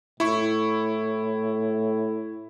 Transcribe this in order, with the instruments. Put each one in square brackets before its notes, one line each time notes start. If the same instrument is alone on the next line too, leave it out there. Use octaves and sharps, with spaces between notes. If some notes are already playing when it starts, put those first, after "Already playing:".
[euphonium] A2 [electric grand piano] E4 C#6